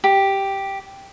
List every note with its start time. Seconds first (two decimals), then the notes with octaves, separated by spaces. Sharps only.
0.04 G4